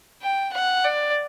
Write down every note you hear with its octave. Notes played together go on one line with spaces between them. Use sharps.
G5
F#5
D5